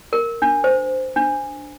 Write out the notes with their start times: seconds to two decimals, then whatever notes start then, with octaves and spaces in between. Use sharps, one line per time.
0.13 A#4
0.42 D4
0.64 C5
1.16 D4